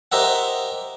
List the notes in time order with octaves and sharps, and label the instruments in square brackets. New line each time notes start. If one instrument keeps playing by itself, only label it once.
[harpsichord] G4 A#4 C5 D#5 E5 F#5